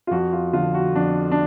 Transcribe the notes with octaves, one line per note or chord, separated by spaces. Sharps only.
F4
F2 F#4
F4
D3 F3 F4
F#4
F2 D4
D4